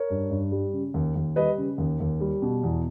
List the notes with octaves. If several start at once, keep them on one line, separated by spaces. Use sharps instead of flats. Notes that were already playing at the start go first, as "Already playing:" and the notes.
Already playing: A#4 C#5
G2
G2
G3
C#3
D#2
D#2
G3 B4 D#5
C#3
D#2
D#2
G3
B2
E2